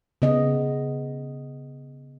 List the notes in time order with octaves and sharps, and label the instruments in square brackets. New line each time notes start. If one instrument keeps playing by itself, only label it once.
[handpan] C#3 B3 D#5